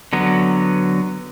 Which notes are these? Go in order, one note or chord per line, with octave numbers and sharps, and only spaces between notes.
D3 F#3 B3